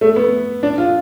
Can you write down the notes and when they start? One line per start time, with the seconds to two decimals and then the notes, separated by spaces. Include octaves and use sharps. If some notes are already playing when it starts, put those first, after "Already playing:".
0.01 A3
0.16 B3
0.63 D4
0.78 F4